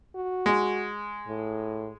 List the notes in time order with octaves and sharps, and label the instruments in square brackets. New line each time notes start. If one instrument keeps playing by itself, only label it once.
[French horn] F#4
[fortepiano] G#3
[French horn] A2